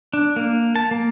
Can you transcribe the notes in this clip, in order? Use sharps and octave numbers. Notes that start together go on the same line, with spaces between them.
D4
A#3
A5
A#3